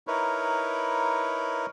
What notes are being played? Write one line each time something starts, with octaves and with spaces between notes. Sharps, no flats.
D#4 E4 A#4 B4 C#5